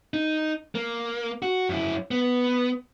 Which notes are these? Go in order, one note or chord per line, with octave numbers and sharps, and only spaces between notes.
D#4
A#3
F#4
F#2 E4
B3